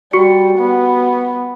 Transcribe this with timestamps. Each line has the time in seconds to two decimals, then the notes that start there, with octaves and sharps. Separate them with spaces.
0.13 G3 F#4 C#6 C#7
0.59 B3